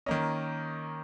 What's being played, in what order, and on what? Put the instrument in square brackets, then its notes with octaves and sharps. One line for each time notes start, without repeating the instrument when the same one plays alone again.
[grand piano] D#3 A#3 C#4 D#5